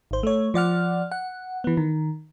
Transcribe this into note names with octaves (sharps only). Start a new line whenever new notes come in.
G#1 C5
A3 C#5
F3 D5 F#5 F6
F#5
E3 B3
D#3